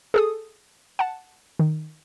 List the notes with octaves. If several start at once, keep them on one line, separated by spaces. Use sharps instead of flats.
G#4 A4 D#6
F#5 A5
D#3